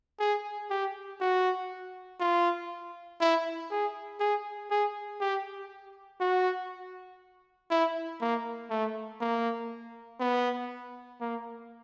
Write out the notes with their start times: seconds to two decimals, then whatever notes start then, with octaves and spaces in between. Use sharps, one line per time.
0.20 G#4
0.70 G4
1.21 F#4
2.20 F4
3.21 E4
3.71 G#4
4.20 G#4
4.71 G#4
5.21 G4
6.21 F#4
7.71 E4
8.21 A#3
8.70 A3
9.21 A#3
10.20 B3
11.21 A#3